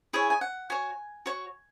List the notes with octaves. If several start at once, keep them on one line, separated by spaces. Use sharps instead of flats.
E4 G#4 C#5 G#5
G#5
F#5
F#4 C#5 G#5
F#4 C#5